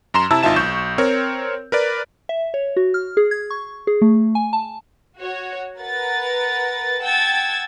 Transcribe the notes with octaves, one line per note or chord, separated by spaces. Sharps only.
F#2 A#5 C6 E7
C3 E4 A5 A#5 E6
G#1 D#4 F4 E5 A5 E7
B1 C#6 G6 E7
C4 A#4 C#5
A#4 B4 D5
E5
C#5
F#4
F6
G#4
G#6
C#6
G#4
A3
G#5
A5
F#4 C#5
A#4 B4 F#5 A6
F#5 G5 A5 E6 G#6 A6